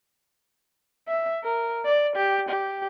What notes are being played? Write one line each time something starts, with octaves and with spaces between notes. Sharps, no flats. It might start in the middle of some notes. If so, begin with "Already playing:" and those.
E5
A#4
D5
G4
G4